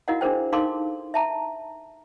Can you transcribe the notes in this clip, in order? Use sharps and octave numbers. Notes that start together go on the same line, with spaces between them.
E4 F#4 A#4 D#5 F5 F#5
D4 G#4 A#4 C5 G5
D#4 A4 A#4 F5 C6 D6
E5 A5 A#5